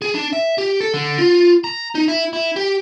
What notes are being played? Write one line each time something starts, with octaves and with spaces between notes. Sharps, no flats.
G#4
D4
E5
G4
A4
D3
F4
A#5
D#4
E4
E4
G4